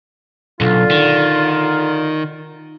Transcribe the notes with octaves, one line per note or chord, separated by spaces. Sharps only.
B1 D3 F4
D#3